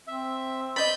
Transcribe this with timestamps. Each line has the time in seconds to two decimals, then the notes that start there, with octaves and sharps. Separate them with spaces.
0.07 C4 E5
0.76 D5 D#5 B5 G6